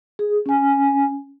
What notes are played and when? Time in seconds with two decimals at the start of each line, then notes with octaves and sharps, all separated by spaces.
0.19 G#4
0.46 C#4 G#5